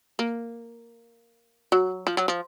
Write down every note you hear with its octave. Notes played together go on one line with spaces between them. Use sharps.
A#3
F#3
F3
F#3
F3